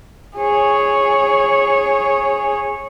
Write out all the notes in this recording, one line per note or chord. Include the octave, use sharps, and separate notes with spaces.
G#4 C#5